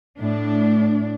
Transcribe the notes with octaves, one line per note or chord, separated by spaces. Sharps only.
A2 D4